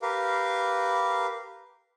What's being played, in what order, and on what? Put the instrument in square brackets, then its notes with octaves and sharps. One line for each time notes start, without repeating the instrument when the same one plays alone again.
[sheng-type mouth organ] G4 A#4 B4 F5